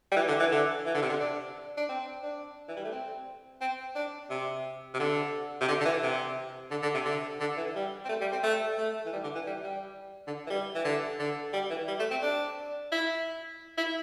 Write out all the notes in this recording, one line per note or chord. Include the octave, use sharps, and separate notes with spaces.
G3
E3
D3
E3
D3
E3
D3
C3
D3
D4
D4
C4
D4
E3
G3
A3
C4
C4
D4
C3
C3
D3
C3
D3
D3
E3
C3
D3
D3
C3
D3
D3
E3
G3
C4
A3
G3
C4
A3
A3
E3
G3
D3
E3
G3
G3
D3
E3
G3
E3
D3
D3
G3
E3
G3
A3
C4
D4
E4
E4